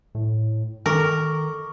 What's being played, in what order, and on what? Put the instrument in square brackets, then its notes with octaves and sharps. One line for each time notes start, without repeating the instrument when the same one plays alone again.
[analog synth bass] A2
[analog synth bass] D#3 [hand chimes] A4 C#6 D6 [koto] A#4